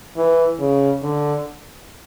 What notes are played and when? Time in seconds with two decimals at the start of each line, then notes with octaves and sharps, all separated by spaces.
0.16 E3
0.60 C#3
1.03 D3